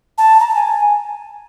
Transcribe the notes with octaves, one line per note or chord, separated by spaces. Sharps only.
A5
A#5
A5
G#5